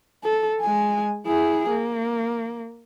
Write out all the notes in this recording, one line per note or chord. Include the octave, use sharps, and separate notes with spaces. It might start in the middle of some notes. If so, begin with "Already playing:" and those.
A4
G#3 G#5
E4 G#4
A#3